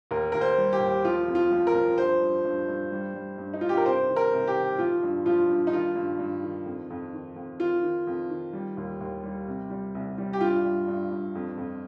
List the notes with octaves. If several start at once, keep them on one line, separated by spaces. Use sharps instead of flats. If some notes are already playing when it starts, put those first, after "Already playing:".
D#2 A#4
D#2 A#4
C5
G3
G4
D#2
F3 F4
F2
F4
F3
A#4
F3
G2 C5
G2
G2
G2
G3
G3
G2
D#4
G2 F4
G4
A#4
C3 C5
D#3
A#4
C2
G4
D#3
F3 F4
G2
F3 F4
G2
D#4
D#3 F4
G2
G2
D#3
F2
F2
D#3
F2
D#3 F4
D#3
F2
D#3
G3
D#2
D#2
G3
C3
G3
C2
G3
G4
G2 F4
G2
G2
G2
F2
F2